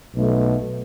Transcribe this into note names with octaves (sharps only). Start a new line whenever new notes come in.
B1 B2 A3